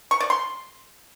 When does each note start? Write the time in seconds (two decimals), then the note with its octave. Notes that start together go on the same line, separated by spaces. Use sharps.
0.11 C#6
0.20 D5
0.30 C6